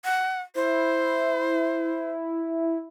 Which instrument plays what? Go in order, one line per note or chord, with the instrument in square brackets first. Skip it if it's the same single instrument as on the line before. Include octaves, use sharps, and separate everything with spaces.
[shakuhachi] F#5
[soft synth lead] E4 [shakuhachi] C5